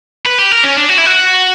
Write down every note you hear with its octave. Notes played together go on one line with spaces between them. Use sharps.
B4
G4
A#4
C#4
D4
F#4
E4
F#4